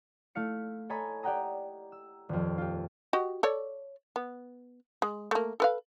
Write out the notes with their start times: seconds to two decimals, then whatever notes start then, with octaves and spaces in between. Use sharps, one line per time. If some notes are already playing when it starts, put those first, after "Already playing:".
0.35 A3 E4 F5 C#7
0.90 A4 C#5 D#5 G#5 A#5 B5
1.23 G4 D5 F#5 G5 A#5 D#6
1.92 E6
2.29 D#1 F2
2.58 F4 G4
3.13 F#4 G4 D#5
3.43 A4 C#5 D5
4.16 B3
5.02 G#3
5.31 A3 A#3
5.60 A4 B4 F5